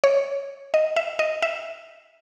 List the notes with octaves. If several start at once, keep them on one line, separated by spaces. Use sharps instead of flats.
C#5
D#5
E5
D#5
E5